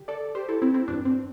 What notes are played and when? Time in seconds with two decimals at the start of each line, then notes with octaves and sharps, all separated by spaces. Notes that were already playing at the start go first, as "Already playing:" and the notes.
Already playing: D3 G4
0.08 A4 D5
0.35 G4 C5
0.49 E4 A4
0.62 C4 E4
0.74 C4 E4
0.88 G1 G2 E3 D4
1.05 C4